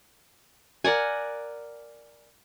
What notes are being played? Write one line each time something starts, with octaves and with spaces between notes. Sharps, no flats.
A#4 D5 F#5 G#5